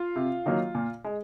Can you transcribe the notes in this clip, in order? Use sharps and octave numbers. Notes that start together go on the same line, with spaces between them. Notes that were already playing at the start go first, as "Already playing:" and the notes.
Already playing: F4 F5
C3
D#3 F#3 A#3
A#2
G#3